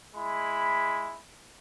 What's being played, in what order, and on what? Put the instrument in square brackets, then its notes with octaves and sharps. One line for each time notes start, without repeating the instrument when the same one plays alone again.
[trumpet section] G#3 E4 B5